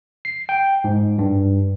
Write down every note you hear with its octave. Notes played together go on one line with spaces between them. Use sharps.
C7
G5
G#2
G2